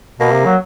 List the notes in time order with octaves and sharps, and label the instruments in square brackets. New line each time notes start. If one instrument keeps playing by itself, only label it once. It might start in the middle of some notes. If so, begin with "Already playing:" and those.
[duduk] B2 [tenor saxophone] A#3
[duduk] C3
F#3